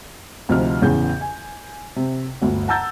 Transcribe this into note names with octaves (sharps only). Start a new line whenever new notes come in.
D2 C3 F3 D#4 F6
A1 E2 C#3 G#4 G6
G#5
C3
G1 D2
F#5 A5 A#5 E6 G6 A6